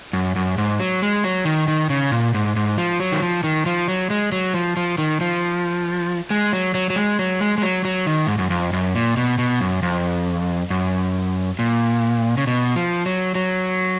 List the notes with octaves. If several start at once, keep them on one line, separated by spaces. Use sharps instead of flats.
F#2
F#2
G#2
F#3
G#3
F#3
D#3
D#3
C#3
A#2
G#2
G#2
F3
F#3
D#3
F3
D#3
F3
F#3
G#3
F#3
F3
F3
D#3
F3
G#3
F#3
F#3
F#3
G#3
F#3
G#3
G#3
F#3
F#3
D#3
G#2
F#2
F2
F#2
A#2
B2
B2
F#2
F2
F#2
A#2
C#3
B2
F3
F#3
F#3